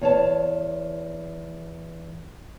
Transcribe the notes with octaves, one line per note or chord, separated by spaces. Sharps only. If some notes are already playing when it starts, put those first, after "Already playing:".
E2 C#5 A5